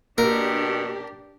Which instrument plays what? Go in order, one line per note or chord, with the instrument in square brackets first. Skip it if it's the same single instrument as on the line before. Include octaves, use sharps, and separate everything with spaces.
[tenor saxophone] B2 [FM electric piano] A#3 [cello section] D4 G4 [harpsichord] A#4